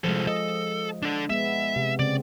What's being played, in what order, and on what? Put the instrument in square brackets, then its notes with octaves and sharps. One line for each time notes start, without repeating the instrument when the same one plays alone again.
[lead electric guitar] C2 A4 [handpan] F3 G#3
[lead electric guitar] A4 [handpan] D#5
[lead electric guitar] D4 A4
[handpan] G#3 B3 [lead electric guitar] E5
[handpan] C3
[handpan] C#3 C4 [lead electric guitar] D5